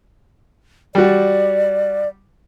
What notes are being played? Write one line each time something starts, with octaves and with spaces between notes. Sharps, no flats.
G3 F#4 D5